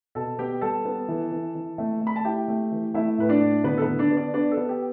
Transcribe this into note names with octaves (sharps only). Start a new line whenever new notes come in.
B2 A4 A5
B3 G4 G5
G3 A4 A5
B3
E3
E3
E3
A3
A3
B5
A5
E4 G4 G5
A3
E3
A3 E4 E5
A2 B4
D4 D5
A2
D3 B3 B4
A4
B3 B4
D3
D4 D5
B3
D4 D5
B3 D4 D5
A4
B3
G4